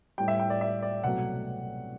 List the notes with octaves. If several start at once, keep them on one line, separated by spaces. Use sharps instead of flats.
A2 G3 G5
E5
G5
D5
E5
D5
C2 B2 F#3 A3 F#5